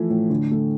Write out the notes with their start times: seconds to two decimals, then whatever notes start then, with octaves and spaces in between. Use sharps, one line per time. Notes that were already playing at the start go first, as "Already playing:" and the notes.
Already playing: E3 F3 A3 E4
0.10 A2
0.30 D3
0.51 A3